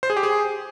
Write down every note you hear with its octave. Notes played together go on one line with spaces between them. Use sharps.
C5
G#4
G4
G#4